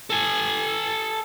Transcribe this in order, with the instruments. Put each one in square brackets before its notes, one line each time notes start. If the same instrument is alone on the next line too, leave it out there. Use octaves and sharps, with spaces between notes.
[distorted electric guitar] A4 G#5